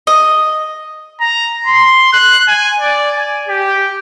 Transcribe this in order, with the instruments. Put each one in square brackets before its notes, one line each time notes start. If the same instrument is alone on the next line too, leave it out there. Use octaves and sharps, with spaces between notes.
[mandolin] D#5
[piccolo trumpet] A#5
C6
F#6
G#5
D5
G#5
G4